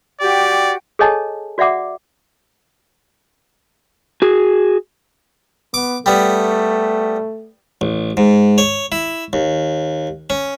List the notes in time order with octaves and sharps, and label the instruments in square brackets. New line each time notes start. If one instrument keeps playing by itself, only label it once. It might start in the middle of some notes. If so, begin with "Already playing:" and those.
[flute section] F#4 G4 G5 [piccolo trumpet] D5
[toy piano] G#4 A4 C#5 D#5 G#5 A5
F#4 D5 E5 F#5 D6
[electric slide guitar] F#4 G#4
[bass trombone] B3 [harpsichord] D6
[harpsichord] G3 B3 [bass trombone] A3
[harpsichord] A1
G#2
C#5
E4
D#2
C#4